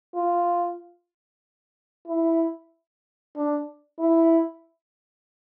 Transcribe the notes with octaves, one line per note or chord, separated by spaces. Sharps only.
F4
E4
D4
E4